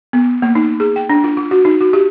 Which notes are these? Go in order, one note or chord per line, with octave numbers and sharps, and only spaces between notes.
B3
A#3
D#4
G#4
G5
D4
F4
F4
F#4
D#4
F#4
G4